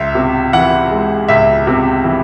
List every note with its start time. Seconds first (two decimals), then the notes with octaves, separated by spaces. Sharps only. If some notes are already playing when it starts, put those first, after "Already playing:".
Already playing: C#2 E5
0.15 C3
0.53 E3 F#5
0.91 G#3
1.28 C#2 E5
1.67 C3
2.04 E3